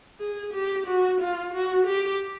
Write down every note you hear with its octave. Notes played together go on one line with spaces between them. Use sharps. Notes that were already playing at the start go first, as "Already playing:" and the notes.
G#4
G4
F#4
F4
F#4
G4